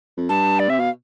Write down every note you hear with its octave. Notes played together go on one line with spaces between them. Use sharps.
F2
G2 A5
D5
C3 E5
B2 F5